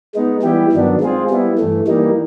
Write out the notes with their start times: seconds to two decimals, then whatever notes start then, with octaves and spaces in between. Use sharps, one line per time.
0.15 G#3 B3 D#4
0.42 E3 G3 B3 E4 G4
0.72 G2 D#3 F#3 B3 D4
1.00 G#3 C4 F4 G#4
1.30 G3 B3 E4
1.58 G2 E3 A3
1.87 E3 G3 A#3 D#4